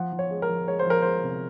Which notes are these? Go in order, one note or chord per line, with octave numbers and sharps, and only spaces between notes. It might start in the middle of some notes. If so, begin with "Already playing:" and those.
Already playing: F3 F#5
F3
C#5
G#3
A#4
F3
G#3 C#5
C5
F3 A#4
G#3 C5
C3